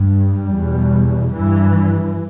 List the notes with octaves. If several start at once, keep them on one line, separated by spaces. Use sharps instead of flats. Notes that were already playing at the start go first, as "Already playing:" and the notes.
Already playing: G2
G3
E2 B2
G2 E3